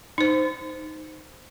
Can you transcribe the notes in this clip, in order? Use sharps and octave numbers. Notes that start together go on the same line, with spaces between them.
D#4 C5